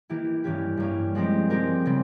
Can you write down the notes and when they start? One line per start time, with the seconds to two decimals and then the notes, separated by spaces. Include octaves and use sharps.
0.09 E3 A#3 E4 G4
0.44 G2 E3 A#3 C#4 G4
0.77 G2 E3 A#3 C#4 G4
1.15 F3 G#3 C4 G4 A#4
1.50 F3 G#3 C4 G4 A#4
1.86 C#3 G3 C4